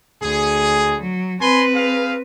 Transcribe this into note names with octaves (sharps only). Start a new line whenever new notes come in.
D2 G#4
F#3
C4 B4 G#5 B5 C6
G#4 F5